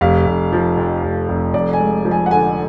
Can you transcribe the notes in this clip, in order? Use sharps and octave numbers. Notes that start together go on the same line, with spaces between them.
F1 F5
F1
F3
F2
F1
F1
F2 D5
G#5
G#3
F3
G#5
F#5
D3 G#5